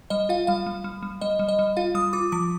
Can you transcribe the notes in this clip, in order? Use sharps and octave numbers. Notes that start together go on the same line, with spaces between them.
G3 D#5
F4 F5
G3 F5
G3
G3
G3
G3 D#5
G3
D#5
G3
F4 F5
G3 D#6
F4 D6
F3 D6